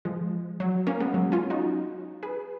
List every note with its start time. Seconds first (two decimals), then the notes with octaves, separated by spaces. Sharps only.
0.05 F3 G#3
0.60 F#3
0.87 A#3 C#4
1.00 G#3 B3
1.14 F#3
1.32 C#4 F4
1.50 D#4 F#4
2.23 G#4 B4